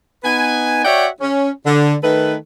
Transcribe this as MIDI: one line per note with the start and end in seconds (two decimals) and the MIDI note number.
0.24 0.83 59
0.24 0.83 63
0.24 0.83 71
0.24 0.83 80
0.85 1.08 66
0.85 1.08 73
0.85 1.08 74
0.85 1.08 76
0.85 1.08 78
0.85 1.08 79
1.21 1.50 61
1.66 1.95 50
2.03 2.35 51
2.03 2.35 57
2.03 2.35 69
2.03 2.35 71